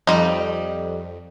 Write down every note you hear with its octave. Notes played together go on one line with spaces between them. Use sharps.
F2 G3 D#4